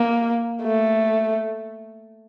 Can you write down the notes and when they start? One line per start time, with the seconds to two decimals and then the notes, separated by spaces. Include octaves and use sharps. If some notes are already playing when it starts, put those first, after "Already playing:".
Already playing: A#3
0.63 A3